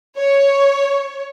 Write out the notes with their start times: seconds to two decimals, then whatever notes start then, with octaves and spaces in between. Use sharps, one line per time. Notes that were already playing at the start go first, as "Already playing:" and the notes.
0.17 C#5